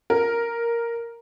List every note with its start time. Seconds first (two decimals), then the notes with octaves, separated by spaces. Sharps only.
0.10 A#4